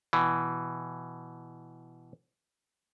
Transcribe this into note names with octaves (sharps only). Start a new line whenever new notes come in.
B2 E3